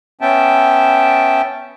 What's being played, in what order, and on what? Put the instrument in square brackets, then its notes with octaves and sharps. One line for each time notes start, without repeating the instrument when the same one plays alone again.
[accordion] B3 C#4 E5 G5 A5